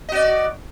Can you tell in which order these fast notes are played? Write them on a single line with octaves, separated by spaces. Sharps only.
D#5 F#4 D5